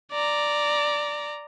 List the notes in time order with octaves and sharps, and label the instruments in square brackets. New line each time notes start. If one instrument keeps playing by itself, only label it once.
[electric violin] D5 A#5